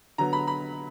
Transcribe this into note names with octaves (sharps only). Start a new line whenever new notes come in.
D3 F#3 B3 A#5
B5
B5